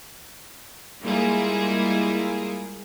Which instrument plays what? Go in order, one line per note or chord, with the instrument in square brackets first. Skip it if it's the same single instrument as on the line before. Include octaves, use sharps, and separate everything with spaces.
[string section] G3 G#3 A#3 E4 F4 G#4